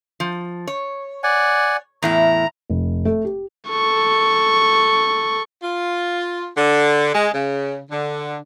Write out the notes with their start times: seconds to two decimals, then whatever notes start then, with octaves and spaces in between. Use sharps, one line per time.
0.20 F3
0.67 C#5
1.24 D5 F#5 G#5
2.02 E2 A2 E4 A#5
2.70 F1
3.05 A3
3.25 G4
3.69 A4 C#6
5.63 F4
6.58 D3
7.14 G#3
7.34 C#3
7.91 D3